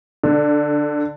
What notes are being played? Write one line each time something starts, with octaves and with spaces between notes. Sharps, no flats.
D3